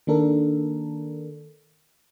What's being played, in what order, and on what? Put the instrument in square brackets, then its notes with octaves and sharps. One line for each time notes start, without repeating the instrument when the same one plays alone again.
[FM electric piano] D#3 A#3 D4 A4 A#4